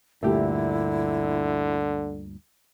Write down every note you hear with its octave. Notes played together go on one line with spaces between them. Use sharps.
D2 G2 A#2 D3 A3 E4 G4